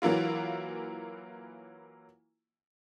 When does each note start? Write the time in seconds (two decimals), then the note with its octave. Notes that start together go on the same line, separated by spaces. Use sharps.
0.02 E3 F#3 A#3 E4 F4